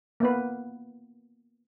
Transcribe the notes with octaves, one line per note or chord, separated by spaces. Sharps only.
A#3 B3 B4